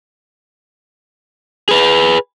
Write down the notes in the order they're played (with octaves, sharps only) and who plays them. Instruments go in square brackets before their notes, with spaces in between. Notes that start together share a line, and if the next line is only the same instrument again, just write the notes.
[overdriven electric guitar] G#4 B4